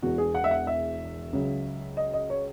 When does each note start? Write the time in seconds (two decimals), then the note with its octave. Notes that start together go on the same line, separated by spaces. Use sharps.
0.02 E1 E2 B2 F#4
0.18 G#4
0.35 F#5
0.44 E5
0.51 F#5
0.67 E5
1.33 C#2 C#3 F#3
1.97 D#5
2.13 D#5
2.30 C#5